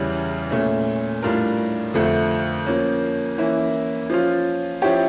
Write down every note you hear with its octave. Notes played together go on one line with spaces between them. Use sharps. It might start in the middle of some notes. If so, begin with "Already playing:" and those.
Already playing: E2 C#3 E3 G3
A#2 A3 C#4
A2 G3 D4 F4 A#4
F2 D3 F3 A3
F3 A#3 C#4
E3 A#3 C#4 E4
F3 C#4 F4
F3 C#4 E4 G4 C#5